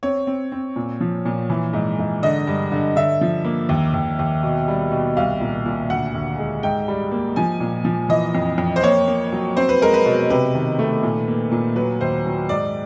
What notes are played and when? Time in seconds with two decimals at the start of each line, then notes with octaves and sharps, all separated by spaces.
0.03 C4 C#5
0.27 C4
0.52 C4
0.76 A#2
1.01 F3
1.25 A#2
1.50 E3
1.73 G#2
1.99 G#2
2.23 D3 D#5
2.47 G2
2.72 D3
2.96 D3 E5
3.21 F3
3.45 A#3
3.69 D#2
3.94 D#2
4.19 D#2
4.43 B2
4.68 G3
4.92 B2
5.17 C2 F5
5.40 A#2
5.66 A#2
5.90 D2 F#5
6.14 D2
6.39 G#3
6.63 G#2 G5
6.88 G3
7.12 A#3
7.36 F3 G#5
7.60 A#2
7.85 F3
8.09 E3 D#5
8.35 F2
8.58 F2
8.76 C5
8.83 A#3 C#5
9.08 A#3
9.33 F#3
9.57 C4 C5
9.69 B4
9.81 G#3 A#4
9.94 B4
10.06 B2
10.30 C3 B4
10.55 D#3
10.79 A3
11.03 A#2
11.28 A#3
11.52 A#2
11.76 F#3 B4
12.00 D#2 C5
12.26 F#3
12.49 G#2 D5